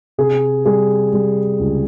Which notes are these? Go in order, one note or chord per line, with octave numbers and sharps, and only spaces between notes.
C3 G#4
G3 G#4
G3
C#2